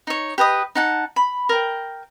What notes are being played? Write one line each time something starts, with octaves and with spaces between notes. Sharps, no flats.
D#4 C#5
G4 B4 D#5 D#6
D#4 F#5 A5
B5
A#4 G5